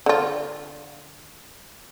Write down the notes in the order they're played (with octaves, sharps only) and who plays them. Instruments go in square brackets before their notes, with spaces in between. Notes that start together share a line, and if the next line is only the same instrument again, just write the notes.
[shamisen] D3 F4